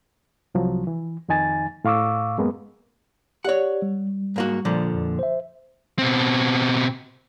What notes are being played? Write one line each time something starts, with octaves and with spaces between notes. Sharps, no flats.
C2 F3 F#3
E3
F2 D#3 D#4 G#5 A6
A2 F5 C#6 D6 E6
F#2 G#3 A#3 B3
G4 C#5 D5 F#5
G3
G#2 A#3 F#4
A#2 D3 F3
F2
C5 E5
B2 C4